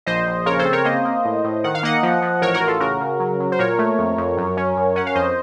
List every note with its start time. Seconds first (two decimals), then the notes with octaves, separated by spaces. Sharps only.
0.06 A#1 C5 D#5
0.27 A#1
0.46 C#3 A#4 C#5
0.59 A4 C5
0.65 C4
0.73 A#4 C#5
0.85 A#3 C5 D#5
1.05 A#3
1.25 A2
1.44 A2
1.64 D#3 F#5
1.75 F5
1.83 A#3 D#5 F#5
2.03 F3
2.22 F3
2.41 A1 A#4 C#5
2.54 F#4 A#4
2.61 A1
2.67 F4 A4
2.80 C#3 F#4 A#4
3.00 C#3
3.20 F#3
3.40 F#3
3.52 C5
3.59 A#2 A#4 C#5
3.79 A3
3.99 F2
4.18 F2
4.37 F#2
4.57 C#4
4.77 F#2
4.96 C#4 F#5
5.07 F5
5.15 F2 C5 D#5